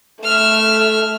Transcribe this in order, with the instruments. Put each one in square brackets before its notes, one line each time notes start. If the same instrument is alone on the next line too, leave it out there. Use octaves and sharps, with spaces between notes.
[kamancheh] A3 [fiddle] E5 F6